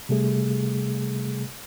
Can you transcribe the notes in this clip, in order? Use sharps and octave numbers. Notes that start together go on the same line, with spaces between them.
C3 G3 A3 G#4